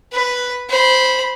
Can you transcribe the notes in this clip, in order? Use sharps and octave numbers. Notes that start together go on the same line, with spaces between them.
B4
C5 B5